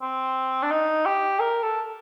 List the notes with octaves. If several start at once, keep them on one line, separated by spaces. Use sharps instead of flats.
C4
D4
D#4
G4
A#4
A4